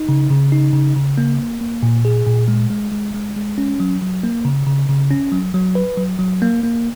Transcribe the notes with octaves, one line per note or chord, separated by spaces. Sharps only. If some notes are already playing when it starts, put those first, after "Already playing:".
Already playing: D#4
C#3
C#3
D#4
C#3
C#3
A#3
A#3
A#3
A#2
G#4
A#2
G#3
G#3
G#3
G#3
G#3
C#4
F#3
F#3
A#3
C#3
C#3
C#3
C#4
F#3
F#3
B4
F#3
F#3
A#3
A#3